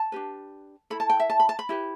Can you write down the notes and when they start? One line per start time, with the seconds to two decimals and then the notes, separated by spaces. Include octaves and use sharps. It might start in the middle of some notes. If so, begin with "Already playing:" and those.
Already playing: A5
0.12 D4 G4 B4
0.90 E4 A4 B5
1.00 A5
1.10 G5
1.20 E5
1.30 A5
1.40 B5
1.49 A5
1.59 B5
1.69 E4 G4 B4